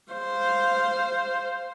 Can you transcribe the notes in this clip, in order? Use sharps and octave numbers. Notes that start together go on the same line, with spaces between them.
C5 F5